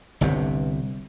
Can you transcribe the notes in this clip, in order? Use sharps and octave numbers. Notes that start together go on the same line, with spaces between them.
G1 C2 G2 C3